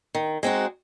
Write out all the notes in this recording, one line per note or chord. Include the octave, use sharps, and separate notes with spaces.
D#3
G#3 C4 D#4 F#4